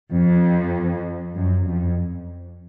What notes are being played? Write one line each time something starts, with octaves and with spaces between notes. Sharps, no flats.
F2
F#2
F2